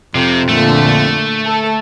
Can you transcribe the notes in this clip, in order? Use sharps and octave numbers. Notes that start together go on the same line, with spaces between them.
F2 C3
A#2 D3 A3
A4